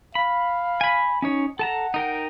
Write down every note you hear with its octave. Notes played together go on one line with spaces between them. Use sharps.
F5 B5
G#5 B5
C#4 D#4 C#5
A4 F#5 A5 A#5
D#4 A#4 G5